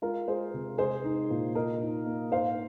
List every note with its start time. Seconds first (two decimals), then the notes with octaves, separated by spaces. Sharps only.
0.02 G#3 F4 A#4
0.28 G#3 G#4 C5
0.54 C3
0.78 G#3 G#4 C5
1.04 D#4
1.30 A#2
1.55 A#2 A#4 D#5
1.81 D#4
2.06 A#3
2.31 G#2 C5 F5